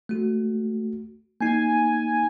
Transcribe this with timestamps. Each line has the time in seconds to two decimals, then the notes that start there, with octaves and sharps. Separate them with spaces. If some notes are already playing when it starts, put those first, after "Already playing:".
0.09 A3 F#4
1.41 A#3 D#4 G#5